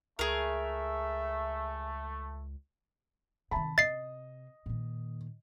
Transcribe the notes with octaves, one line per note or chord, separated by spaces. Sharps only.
C#2 A3 G#4 A#4 E5
C3 D#3 A5 B5
C3 D#5 A6 C7
A#2 D#3